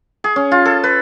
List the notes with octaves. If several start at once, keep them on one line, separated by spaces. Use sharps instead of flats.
G#4
C#4
F4
A4
B4